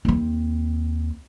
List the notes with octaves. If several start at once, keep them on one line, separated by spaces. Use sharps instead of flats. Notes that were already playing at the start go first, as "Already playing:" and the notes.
D#2 C4